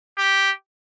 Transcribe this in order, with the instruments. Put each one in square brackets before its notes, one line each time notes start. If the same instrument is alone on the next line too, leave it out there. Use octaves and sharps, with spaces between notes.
[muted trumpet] G4